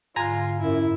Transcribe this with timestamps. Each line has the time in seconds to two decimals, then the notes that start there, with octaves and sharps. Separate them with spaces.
0.16 G#2 D3 F4 G#5 A#5
0.61 F#2 E4